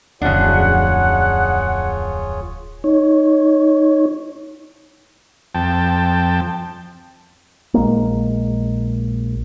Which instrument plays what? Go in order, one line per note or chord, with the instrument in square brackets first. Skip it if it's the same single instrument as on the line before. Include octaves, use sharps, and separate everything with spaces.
[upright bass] D1 F2 [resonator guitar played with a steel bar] C#3 D4 [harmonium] F4 G#4 C#5 [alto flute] F#5
[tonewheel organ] D#4 C#5
[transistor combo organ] F2 G5 A5
[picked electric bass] A#1 G#3 A#3